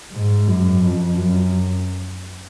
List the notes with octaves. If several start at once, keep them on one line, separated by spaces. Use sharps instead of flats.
G#2
F#2
F2
F#2